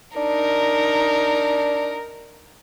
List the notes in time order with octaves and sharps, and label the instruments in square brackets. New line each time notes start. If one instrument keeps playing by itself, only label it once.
[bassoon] D4 [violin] D#4 A#4